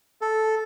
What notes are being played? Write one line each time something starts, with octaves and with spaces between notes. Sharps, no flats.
A4